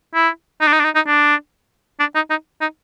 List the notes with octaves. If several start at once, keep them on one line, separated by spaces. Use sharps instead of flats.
E4
D#4
D4
D#4
D4
D#4
D#4
D4
D4
D#4
D#4
D#4